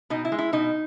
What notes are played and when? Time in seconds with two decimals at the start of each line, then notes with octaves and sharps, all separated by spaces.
0.10 B2 D#4
0.25 E4
0.32 G#3
0.39 E4
0.53 B2 D#4